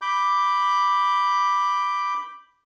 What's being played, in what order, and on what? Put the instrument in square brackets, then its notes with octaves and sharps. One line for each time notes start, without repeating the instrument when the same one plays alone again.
[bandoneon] B5 D6 G6